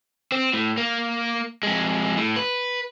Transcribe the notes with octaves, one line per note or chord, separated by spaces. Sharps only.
C4
A2
A#3
F2 G#3
A2
B4